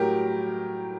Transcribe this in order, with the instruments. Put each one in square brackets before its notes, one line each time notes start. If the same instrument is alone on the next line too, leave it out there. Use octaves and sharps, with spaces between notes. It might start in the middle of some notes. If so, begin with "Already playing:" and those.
Already playing: [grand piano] A2 F#3 G4 A#4